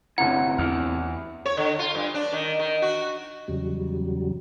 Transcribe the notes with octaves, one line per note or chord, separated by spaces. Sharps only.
G1 A2 C3 E3 C#4 F#5 A#5
E2 F6
C#5
D3
F4
G2
D4
D#3
D#3
F#4
E2 C#3 F#3 G3